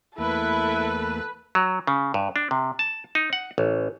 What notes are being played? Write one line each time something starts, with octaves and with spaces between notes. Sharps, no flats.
E2 A3 A#3 E4 A4 B4
F#3
C#3
G2
D4
C3
A5
D#4
F#5
A1